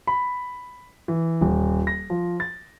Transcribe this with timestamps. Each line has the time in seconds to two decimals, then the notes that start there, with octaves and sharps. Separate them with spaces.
0.07 B5
1.08 E3
1.41 D#1
1.87 A#6
2.10 F3
2.40 A6